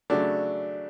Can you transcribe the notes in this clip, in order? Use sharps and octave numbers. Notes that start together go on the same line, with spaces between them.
C#3 F#3 A3 D4